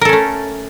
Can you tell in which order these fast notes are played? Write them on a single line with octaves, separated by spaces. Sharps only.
A#4 A4 C#4 A3